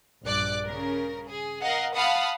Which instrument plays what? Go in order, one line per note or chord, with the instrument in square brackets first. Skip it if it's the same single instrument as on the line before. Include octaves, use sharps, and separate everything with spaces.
[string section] A#1 G2 D5 D6 F#6
C#3 A#4
G#4
A#4 D#5 F5 F#5
F5 F#5 A5 B5 D#6